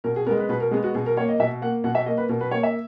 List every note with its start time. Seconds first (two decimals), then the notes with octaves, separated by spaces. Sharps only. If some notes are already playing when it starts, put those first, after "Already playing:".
0.04 B2 A#4
0.16 G#4
0.26 B3 A#4
0.31 G#3
0.39 B4
0.49 B2 B4
0.60 A#4
0.71 G#3 B3 G#4
0.84 F#4
0.95 B2 G#4
1.06 A#4
1.17 A#3 C#5
1.29 D#5
1.40 B2 E5
1.62 A#3 F#5
1.84 B2 F#5
1.95 E5
2.06 A#3 D#5
2.18 B4
2.29 B2 A#4
2.41 B4
2.51 A#3 C#5
2.63 E5